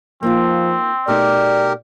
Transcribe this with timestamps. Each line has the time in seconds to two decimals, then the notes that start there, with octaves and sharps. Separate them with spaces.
0.23 F3 A#3 C4 D#4 F4
1.08 B2 A3 D#4 G4 A#4 D5